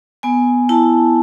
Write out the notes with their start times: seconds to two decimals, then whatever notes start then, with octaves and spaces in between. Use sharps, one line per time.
0.23 B3 G#5
0.69 E4 A5